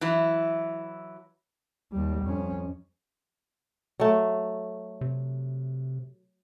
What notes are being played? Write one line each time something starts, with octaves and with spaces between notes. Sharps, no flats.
E3 F#3 E4
D#2 G3
F2 C#4
F#3 A3
C3